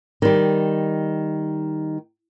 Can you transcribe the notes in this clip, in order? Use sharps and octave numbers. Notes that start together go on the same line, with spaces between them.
D#3 G3